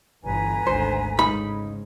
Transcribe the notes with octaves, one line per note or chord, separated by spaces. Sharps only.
G1 B2 E3 B4 G#5 A#5
G#1 D2 D3 C5
G#2 C#3 D#4 B5